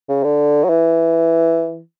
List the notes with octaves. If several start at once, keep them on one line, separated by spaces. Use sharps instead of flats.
C#3
D3
F#3
E3